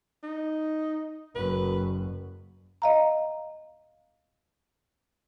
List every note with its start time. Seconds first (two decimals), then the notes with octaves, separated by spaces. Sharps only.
0.23 D#4
1.36 F#1 F#2 B4
2.82 D#5 F5 A#5